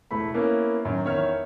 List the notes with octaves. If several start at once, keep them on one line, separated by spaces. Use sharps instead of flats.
E1 A3 E4 B5
A#3 B3 C#4 E4
F#2 D#3
E2 D#3 C#5 E5 F6